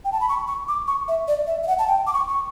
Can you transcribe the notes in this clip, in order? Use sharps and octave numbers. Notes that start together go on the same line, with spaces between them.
G5
A5
B5
C#6
C#6
D6
C#6
E5
D5
E5
E5
F#5
A5
G5
D6
C#6
C#6